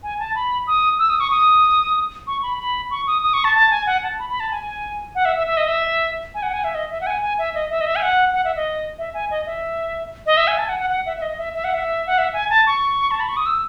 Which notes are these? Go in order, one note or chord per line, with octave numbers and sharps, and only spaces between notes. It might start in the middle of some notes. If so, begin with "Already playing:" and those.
G#5
A5
B5
D#6
E6
D#6
C#6
D#6
C#6
B5
B5
C#6
D#6
D#6
C#6
A5
A5
G#5
F#5
A5
B5
B5
A5
G#5
F#5
E5
E5
E5
D#5
E5
G#5
F#5
G#5
E5
D#5
E5
F#5
G#5
G#5
E5
D#5
E5
D#5
E5
G#5
F#5
F#5
E5
D#5
E5
G#5
D#5
E5
D#5
E5
G#5
A5
G#5
F#5
F#5
F#5
E5
E5
D#5
E5
E5
F#5
E5
F#5
E5
G#5
A5
C#6
A5
B5
C#6
D#6
E6